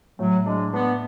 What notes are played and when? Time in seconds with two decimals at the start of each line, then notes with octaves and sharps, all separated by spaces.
0.19 A2 F#3
0.46 G#3 D4
0.73 B3 D4